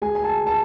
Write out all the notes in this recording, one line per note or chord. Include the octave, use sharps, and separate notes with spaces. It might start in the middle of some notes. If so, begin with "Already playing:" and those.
G#3 G#5
G#5
A5
A5